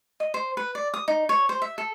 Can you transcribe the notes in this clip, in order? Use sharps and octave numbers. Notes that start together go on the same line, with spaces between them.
D#5
C5
B4
D5
D#6
D#4
C#5
C5
E5
A4